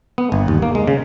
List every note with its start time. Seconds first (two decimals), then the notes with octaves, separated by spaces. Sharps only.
0.18 B3
0.32 G1
0.48 D#2
0.62 A#3
0.75 G#3
0.87 C#3